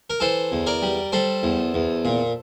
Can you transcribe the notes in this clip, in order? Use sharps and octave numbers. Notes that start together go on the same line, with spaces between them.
A#4
E3 A4 C5
E2
A#4 D5
G3
G3 A4 C5
E2
E2
A#2